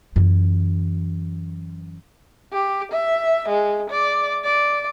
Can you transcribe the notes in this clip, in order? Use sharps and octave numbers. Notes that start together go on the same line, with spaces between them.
F#2 E3
G4
E5
G#3
D5
D5